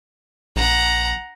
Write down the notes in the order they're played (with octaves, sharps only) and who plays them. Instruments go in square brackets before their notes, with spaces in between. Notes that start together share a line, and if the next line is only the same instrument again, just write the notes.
[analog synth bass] A#1 [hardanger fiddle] F#5 A#5